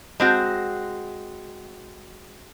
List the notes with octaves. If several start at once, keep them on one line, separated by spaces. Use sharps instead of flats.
G#3 C4 F#4